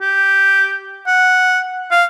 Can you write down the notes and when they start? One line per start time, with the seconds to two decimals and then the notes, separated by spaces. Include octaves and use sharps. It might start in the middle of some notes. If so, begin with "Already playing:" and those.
0.01 G4
1.07 F#5
1.91 F5